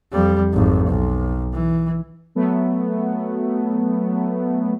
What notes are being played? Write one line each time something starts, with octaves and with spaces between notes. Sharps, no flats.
F2 G3
G#1 F2
B1
E3
F#3 A3 B3